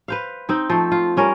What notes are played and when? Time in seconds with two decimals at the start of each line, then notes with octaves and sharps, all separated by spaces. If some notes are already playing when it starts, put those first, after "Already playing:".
0.08 B4 C5 F5
0.49 C4 D#4
0.70 F3 A3
0.92 F4
1.17 G3 C#4 A#4